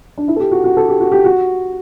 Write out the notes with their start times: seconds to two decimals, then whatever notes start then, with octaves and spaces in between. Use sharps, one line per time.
0.18 D4
0.28 E4
0.36 A4
0.40 G4
0.51 F#4
0.64 F#4
0.77 A4
0.89 G4
1.01 F#4
1.12 G4
1.24 F#4